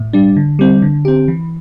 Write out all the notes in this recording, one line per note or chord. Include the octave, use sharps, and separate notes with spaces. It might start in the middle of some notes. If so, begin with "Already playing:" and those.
Already playing: A2
G3 D4
D3
G3 C4
D3
C4 G4
E3